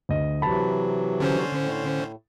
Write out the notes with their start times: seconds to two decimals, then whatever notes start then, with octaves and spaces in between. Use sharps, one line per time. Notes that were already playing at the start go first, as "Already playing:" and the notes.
0.09 D2 D#5
0.42 C3 E3 F#3 A5 B5
1.20 D3 C#4 C5
1.54 A2